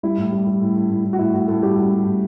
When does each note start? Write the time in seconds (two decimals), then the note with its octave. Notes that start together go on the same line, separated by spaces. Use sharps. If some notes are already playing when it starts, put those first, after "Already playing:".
0.03 G3 E4
0.17 A2
0.32 G3
0.47 G3
0.61 A2
0.76 A2
0.90 A2
1.04 A2
1.13 F#4
1.19 A2 E4
1.34 A2 F#4
1.48 A2 A4
1.63 G3 G4
1.77 G3 F#4
1.92 G3
2.06 A2